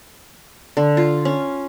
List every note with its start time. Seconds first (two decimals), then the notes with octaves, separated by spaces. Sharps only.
0.77 D3
0.97 F4
1.25 C#4